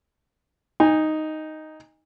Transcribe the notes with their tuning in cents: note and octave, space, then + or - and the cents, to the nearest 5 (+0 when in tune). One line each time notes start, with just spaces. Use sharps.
D#4 +0 G#5 -35